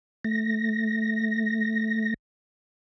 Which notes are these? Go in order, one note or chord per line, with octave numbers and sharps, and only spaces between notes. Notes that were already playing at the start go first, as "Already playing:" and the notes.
A3 A#6